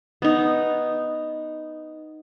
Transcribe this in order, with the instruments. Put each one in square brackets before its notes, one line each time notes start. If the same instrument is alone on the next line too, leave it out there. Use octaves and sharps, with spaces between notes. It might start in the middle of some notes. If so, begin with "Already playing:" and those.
[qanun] B3 D#4